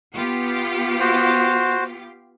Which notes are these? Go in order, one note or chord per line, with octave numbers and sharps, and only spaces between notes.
B3 F4 G4
F#4 C5